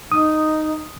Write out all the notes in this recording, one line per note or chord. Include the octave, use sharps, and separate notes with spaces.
D#4 D#6